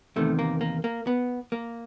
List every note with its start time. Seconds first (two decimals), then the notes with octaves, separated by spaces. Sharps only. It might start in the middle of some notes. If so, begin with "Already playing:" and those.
0.16 E2 C3 D#3 A3
0.39 A#3
0.61 A#3
0.84 A#3
1.07 B3
1.52 A#3